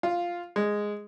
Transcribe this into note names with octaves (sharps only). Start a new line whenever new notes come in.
F4
G#3